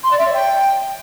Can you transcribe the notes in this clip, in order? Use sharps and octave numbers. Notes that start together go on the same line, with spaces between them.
C6
D5
E5
C#5
G5